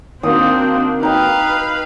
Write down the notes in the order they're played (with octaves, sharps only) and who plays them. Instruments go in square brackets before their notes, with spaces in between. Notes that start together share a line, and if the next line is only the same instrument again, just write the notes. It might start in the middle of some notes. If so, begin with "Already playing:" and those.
[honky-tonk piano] D#3 A#3 F#4 [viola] C4 D4 [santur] D#6
[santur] D#4 G5 [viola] B4 F5